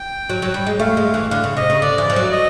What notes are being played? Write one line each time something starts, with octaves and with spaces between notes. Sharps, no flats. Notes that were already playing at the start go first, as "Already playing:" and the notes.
Already playing: G5
F#3
F#3
G3
G#3
A3 F5
G#3
E3
D3 F5
C#3
C3 D#5
C#3
D3 D5
E3
F3
F#3
D#5